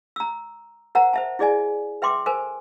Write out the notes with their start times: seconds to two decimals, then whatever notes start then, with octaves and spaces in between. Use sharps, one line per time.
0.16 A#5 E6
0.95 A#4 C5 F#5 A#5
1.13 C5 E5 A5
1.39 E4 G#4 D5 D#5 G#5
2.02 B4 E5 G5 C6 D6
2.26 A4 A#4 C5 G#5